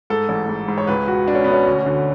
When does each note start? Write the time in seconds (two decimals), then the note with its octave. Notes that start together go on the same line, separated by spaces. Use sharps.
0.10 G#2 A4
0.29 A1
0.49 G#2
0.68 G#2
0.78 C#5
0.87 C#2 B4
1.07 B2 F#4
1.28 B2 D4
1.35 C#4
1.44 B2 B3
1.53 C#4
1.67 D2
1.86 D3